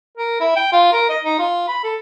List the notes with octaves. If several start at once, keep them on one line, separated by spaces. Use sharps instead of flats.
A#4
E4
G5
F4
A#4
D#5
D#4
F4
B5
A4